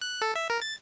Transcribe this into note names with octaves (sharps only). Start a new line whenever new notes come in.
F#6
A4
E5
A#4
A6